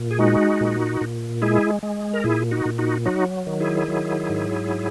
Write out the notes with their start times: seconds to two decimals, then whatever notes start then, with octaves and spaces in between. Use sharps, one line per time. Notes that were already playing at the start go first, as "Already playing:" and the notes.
Already playing: A#2
0.11 G#4
0.19 G#3 D#4 F#4
0.61 A#2
1.01 A#2
1.42 G#3 E4 G#4
1.83 G#3
2.13 A#4
2.24 A#2 E4 G#4
2.51 D#4 F#4
2.65 A#2
2.78 D#4 F#4
3.06 F#3 D#4 F#4
3.47 D#3
3.60 E4 G#4
3.88 F#3
4.29 G#2